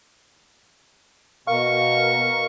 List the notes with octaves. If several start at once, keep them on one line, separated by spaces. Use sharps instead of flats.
B2 A#4 F5 C#6